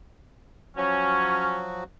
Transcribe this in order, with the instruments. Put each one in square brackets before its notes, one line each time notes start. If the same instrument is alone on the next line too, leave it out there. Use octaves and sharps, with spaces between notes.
[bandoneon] F3 F#3 F#4 [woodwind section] C#4